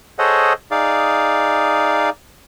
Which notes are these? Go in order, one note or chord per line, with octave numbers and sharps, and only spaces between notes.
G#4 A4 C5 C#5 D#5 F#5
D#4 G#4 D5 F5